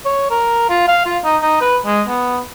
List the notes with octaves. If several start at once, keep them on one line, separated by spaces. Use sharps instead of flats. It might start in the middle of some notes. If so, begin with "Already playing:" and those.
C#5
A#4
F4
F5
F4
D#4
D#4
B4
G#3
B3